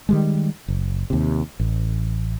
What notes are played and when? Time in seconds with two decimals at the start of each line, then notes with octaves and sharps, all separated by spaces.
0.09 D#3 G3 G#3
0.68 F#1
1.10 D#2 C3
1.60 A1